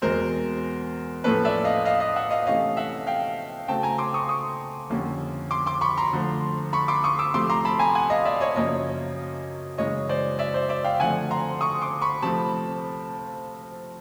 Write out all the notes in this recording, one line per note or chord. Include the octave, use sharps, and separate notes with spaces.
E2 B2 G#3 C4 A#4 C5
A2 F3 A#3 C#4 A4 B4
D5 E5
D#5 F5
D#5 F5
D#5 F5
E5 F#5
D#5 F5
C3 E3 A3 C#4 D#5 F5
E5 F#5
F5 G5
C#3 F#3 A3 C4 G5 A5
G#5 A#5
C6 D6
C#6 D#6
C#6 D#6
F2 D3 G3 A#3 C#4
C6 D6
C6 D6
B5 C#6
A#5 C6
D3 F3 A3
B5 C#6
C6 D6
C#6 D#6
D6 E6
C3 F3 A3 C6 D6
A#5 C6
A5 B5
G#5 A#5
F#5 G#5
D#5 F5
D5 E5
C#5 D#5
F#2 C#3 F3 A#3 C#4 C#5 D#5
F#2 C#3 E3 G#3 C#4 C#5 D#5
C5 D5
D5 E5
C5 D5
D5 E5
F5 G5
D3 F3 A3 C4 F#5 G#5
A#5 C6
C#6 D#6
C6 D6
B5 C#6
C3 F3 A3 C4 A5 B5